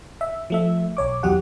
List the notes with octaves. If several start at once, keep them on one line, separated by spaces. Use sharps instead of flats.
E5
F3 A3 E5
B1 C#5 D6
E2 F#3 G4 F#5